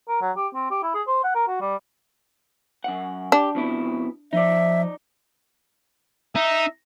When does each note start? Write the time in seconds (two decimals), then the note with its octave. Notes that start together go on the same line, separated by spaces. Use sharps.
0.08 A#4
0.22 F#3
0.37 G4
0.54 C4
0.71 G4
0.83 E4
0.95 G#4
1.07 C5
1.24 F#5
1.35 A#4
1.48 F#4
1.61 G3
2.84 F#2 F#5
3.32 D4 G4
3.55 F2 B2 E4
4.33 F3 D#4 D5 E5
6.36 D#4 E5